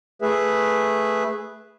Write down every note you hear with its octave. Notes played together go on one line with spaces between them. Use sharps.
A3 G#4 B4 E5